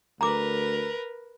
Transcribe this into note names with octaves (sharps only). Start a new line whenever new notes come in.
D2 A#4 B4 A#5 D6